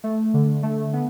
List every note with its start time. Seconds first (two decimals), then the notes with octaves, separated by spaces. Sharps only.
0.04 A3
0.34 D3
0.63 A3
0.93 B3